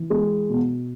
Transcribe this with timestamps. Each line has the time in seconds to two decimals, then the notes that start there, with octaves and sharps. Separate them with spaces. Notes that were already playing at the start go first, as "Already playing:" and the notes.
Already playing: E3
0.10 G#3
0.49 B2